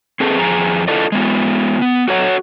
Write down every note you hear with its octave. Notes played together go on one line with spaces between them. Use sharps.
C4 G#4 A4 B4
F2 G#4 A#5
D4 E4 F4 A4 D5 D#5
G#3 B3 F4
B3
F#4 A4 C#5 F5 F#5